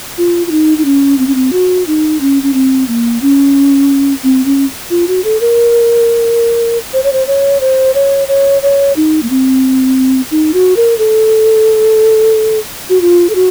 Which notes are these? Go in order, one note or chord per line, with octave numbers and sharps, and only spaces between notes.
F4
F4
D#4
D#4
C#4
C4
C#4
C4
F#4
D#4
C#4
C#4
C4
A#3
C#4
C4
C#4
F4
F#4
A4
A#4
C5
C#5
C5
C#5
C5
C#5
C#5
C#5
D#4
A#3
C4
D#4
F#4
A#4
A4
F#4
F4
A4
F#4